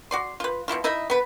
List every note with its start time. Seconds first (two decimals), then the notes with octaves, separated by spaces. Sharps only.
0.11 F#4 D5 C6
0.40 F4 B4
0.68 B2 G#3 E4 F4
0.84 D#4 E4 D#5 E5
1.10 B3 B4